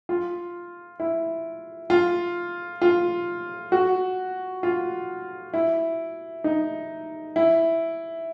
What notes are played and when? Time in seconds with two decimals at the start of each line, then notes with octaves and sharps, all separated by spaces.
0.09 F4
1.00 E4
1.90 F4
2.82 F4
3.72 F#4
4.63 F4
5.54 E4
6.44 D#4
7.36 E4